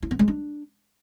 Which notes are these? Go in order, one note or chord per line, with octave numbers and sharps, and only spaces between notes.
E4
B3
G#3
D4